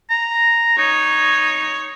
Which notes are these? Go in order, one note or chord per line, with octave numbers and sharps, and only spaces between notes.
A#5
D#4 C#5